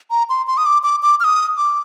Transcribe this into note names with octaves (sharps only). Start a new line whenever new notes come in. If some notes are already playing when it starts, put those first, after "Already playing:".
A#5
C6
C6
D#6
D6
D6
D6
F6
D#6
D6